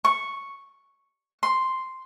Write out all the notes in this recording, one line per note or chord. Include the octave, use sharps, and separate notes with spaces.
C#6
C6